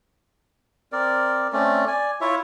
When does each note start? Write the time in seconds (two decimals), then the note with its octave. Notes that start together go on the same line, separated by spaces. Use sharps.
0.92 C4 A#4 D5
1.53 A3 C4 C#4 D5
1.87 D5 G#5
2.21 E4 F4 C#5 E5